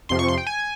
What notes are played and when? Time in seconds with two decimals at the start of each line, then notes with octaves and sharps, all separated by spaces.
0.09 F2 C3 F3 C6
0.19 C#6
0.28 C6
0.37 G5
0.46 G#5